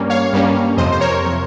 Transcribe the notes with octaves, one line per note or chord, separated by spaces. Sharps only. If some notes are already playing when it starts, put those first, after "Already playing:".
Already playing: G2 G3 A#3 C#4
C#5 F5
G2 G3 A#3 C#4
F2 C3 F3 C5 D#5
C5
A#4 C#5
C3 F3